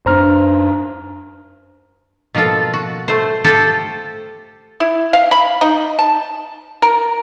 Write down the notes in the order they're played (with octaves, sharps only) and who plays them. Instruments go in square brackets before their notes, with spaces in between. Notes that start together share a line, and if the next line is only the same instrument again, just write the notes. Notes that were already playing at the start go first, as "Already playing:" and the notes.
[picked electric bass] F#2 C4 D4 [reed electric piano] C5 A#5 F6
[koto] B2 F3 A#3 F4 A4
F#4
A3 C5
F4 G4 A4 C5
[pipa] E4
F5
B5
D#4
A5
A#4